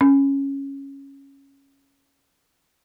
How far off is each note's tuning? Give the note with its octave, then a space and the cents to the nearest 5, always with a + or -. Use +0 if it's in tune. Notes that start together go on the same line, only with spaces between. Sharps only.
C#4 -10